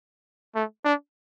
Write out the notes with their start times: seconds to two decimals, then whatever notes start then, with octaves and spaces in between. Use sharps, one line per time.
0.55 A3
0.85 D4